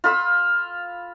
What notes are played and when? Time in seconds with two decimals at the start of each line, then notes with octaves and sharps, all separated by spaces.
0.04 F4 B5 E6